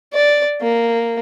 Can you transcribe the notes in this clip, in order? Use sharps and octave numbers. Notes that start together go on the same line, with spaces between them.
D5
A#3